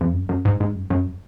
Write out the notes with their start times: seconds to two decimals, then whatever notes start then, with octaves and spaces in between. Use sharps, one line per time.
0.01 F2
0.13 F#2
0.29 F#2
0.45 G#2
0.60 G#2
0.75 F#2
0.90 F#2